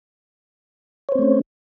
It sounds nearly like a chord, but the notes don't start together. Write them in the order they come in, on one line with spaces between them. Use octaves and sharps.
C#5 C5 C4 A3 C#4